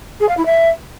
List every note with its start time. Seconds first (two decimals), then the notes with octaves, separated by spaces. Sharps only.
0.20 G#4
0.29 F5
0.37 E4
0.46 E5